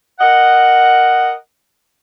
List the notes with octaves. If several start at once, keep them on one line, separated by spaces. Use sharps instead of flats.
A#4 D#5 F#5